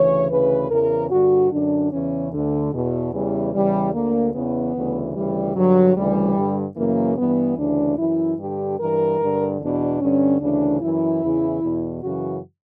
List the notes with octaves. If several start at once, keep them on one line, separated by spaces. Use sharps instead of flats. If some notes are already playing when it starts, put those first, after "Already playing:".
Already playing: D2 C#3 E3 C#5
D2 C#3 E3 B4
E2 C#3 E3 A#4
G2 D3 F#4
F#2 D3 D4
E2 C#3 E3 C#4
D2 D3
E2 B2
E2 C#3 E3 G3
E2 C#3 E3 G3
D2 D3 A#3
E2 C#3 E3 B3
D2 C#3 E3
D2 C#3 E3 G3
G2 D3 F#3
D2 C#3 E3 G3
G2 D3
F#2 C#3 E3 A#3
G2 E3 B3
D2 C#3 E3 D4
F#2 E3 E4
G2 D3 G4
G2 E3 A#4
G2 D3
E2 B2 D4
G2 D3 C#4
D2 C#3 E3 D4
F#2 E3 E4
E2 C#3 E3
E2 B2
F#2 C#3 E3 F#4